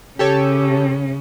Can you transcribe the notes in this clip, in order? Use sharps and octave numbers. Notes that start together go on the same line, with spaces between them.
C#3 C#4 G4 A4 C#5